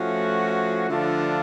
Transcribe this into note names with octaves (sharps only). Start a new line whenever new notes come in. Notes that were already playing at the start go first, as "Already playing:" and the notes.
Already playing: F3 A3 C#4 F#4
D3 F3 A3 D4 F4